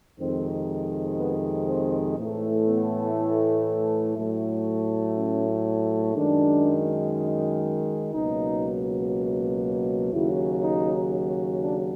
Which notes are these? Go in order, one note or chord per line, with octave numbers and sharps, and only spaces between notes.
F2 C3 D#3 G#3 C4
B3
C4
A2 E3 A3
B3
A2 F#3 A3
C#4
F#2 D#3 G#3 D4
C#2 B2 F#3 A#3 D#4
D#2 C#3 F#3 E4
D#4
D4